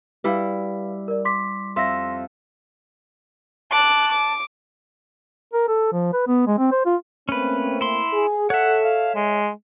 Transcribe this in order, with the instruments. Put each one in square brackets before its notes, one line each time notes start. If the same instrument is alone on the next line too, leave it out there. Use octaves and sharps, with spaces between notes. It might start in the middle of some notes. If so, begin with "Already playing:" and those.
[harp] G3 E4 [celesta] B4 F5
[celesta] A#4 D5
C6 D6 B6
[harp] F2 E5 [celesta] C6 A#6
[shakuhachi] A5 [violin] D6 F#6
[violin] D6
[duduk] A#4
A4
F3
B4
B3
G#3
C4
C5
F4
[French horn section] A3 A#3 C4 [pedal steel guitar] C#4 B4
[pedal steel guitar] E4 C6
[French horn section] G#4
[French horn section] A4 [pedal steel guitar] C#5 E5 [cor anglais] F#5
[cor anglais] F5
G#3